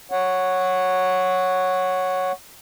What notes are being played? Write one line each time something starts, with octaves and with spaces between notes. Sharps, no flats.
C#5 F#5